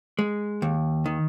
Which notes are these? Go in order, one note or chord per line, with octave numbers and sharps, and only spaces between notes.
G#3
D#2
D#3